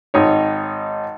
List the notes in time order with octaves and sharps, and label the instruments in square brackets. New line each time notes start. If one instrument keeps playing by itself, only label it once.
[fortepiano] G#1 D#4 C#5